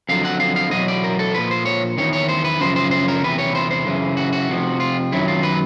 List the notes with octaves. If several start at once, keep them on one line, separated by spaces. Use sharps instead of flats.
F2 D3 F#3 F5
F#5
F5
F5
E2 B2 F#3 D#5
D5
A#4
A4
A#2 F3 B4
C5
C#5
E2 C3 D#3 C#5
C#5
C5
B4
F#2 C#3 F3 C5
C5
C5
A#4
E2 C3 E3 B4
C#5
C5
C5
F#2 C#3 E3
F#4
F#4
F2 C3 F3
F4
F#2 D#3 F#3 E4
F4
B4